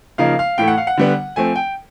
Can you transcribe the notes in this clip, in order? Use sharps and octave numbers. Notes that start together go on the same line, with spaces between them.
C#3 F3 A#3 D#4 F5
F5
A2 E3 A3 G5
F#5
F5
F#5
D3 G3 B3
F3 A3 C4 G#5
G5